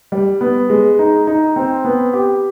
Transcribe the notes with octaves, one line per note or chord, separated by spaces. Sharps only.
G3
B3
G#3
D#4
D#4
C4
B3
G4